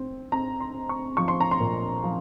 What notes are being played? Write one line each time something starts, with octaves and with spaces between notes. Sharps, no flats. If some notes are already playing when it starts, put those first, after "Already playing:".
Already playing: C4
C4 A#5
C6
C4
C#6
F3 C#6
C6
A#5
C6
A#2
F3